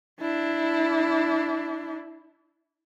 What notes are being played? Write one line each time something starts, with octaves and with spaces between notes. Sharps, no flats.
D4 E4